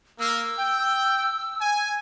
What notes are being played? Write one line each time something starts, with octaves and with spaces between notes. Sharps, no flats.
A#3 E6
G5
G#5